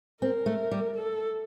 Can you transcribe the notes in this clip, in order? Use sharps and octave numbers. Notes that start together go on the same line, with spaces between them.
C4 A#4
A3
G3
A4